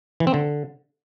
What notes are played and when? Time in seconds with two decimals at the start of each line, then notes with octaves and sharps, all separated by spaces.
0.20 E3
0.27 C4
0.34 D3